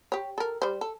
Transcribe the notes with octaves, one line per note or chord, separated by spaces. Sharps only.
G4 C#5
A4 A#4
G3 C5
A4